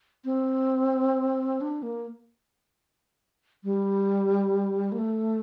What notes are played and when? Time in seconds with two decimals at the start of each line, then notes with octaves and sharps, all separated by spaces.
0.25 C4
1.61 D4
1.83 A#3
3.64 G3
4.92 A#3
4.98 A3